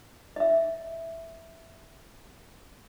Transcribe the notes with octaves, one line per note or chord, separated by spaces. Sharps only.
D#5 E5